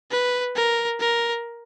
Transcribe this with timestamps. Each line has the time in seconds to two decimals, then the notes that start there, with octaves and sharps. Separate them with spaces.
0.11 B4
0.56 A#4
1.00 A#4